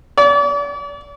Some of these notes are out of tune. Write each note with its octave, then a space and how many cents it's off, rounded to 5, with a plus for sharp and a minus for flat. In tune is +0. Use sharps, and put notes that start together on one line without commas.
D5 -40